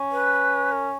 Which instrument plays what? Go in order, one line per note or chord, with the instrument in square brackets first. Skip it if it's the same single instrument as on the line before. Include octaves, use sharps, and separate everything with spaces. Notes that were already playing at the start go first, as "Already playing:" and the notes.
Already playing: [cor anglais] C#4
[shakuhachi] B4
A#4